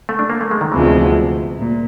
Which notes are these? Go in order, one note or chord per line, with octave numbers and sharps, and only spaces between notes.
A3
D4
A#3
A3
G#3
D#3
D2 C3 E3 F3 G#3 B3
A#2